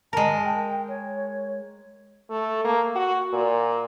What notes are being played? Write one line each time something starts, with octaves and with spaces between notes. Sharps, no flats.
G#3 A#4 A5
G5
C#5
A3
A#3
F#4
A#2